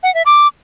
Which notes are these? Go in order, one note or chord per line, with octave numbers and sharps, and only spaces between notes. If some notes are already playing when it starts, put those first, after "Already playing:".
F#5
E5
D6